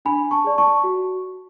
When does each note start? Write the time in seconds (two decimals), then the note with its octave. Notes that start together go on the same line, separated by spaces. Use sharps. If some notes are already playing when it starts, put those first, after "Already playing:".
0.05 D4 G#5 B5
0.31 A5 C#6
0.44 G#4 D5
0.58 A5 C#6
0.84 F#4